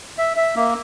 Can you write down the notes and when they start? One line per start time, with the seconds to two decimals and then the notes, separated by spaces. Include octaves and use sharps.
0.18 E5
0.37 E5
0.56 A#3